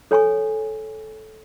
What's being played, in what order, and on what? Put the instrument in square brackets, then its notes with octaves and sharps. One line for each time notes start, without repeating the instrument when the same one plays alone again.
[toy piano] A4 C#5 G#5 C#6